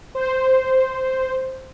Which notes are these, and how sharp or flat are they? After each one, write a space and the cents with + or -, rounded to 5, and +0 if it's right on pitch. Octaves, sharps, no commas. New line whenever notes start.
C5 -5